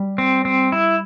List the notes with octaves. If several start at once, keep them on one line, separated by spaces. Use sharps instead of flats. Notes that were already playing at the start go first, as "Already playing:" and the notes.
Already playing: G3
C4
C4
E4